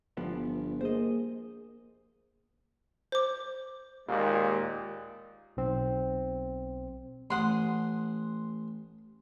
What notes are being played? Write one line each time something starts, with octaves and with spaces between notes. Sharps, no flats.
G1 F3 B3 D4
A#3 G#4 C5 D#5
C5 D6
D#2 A#2 G#3
B1 C4
A1 F#5 C6 D#6